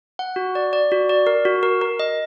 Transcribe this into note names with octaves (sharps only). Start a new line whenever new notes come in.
F#5
F#4
D5
D5
F#4
D5
A#4
F#4
A#4
A#4
D#5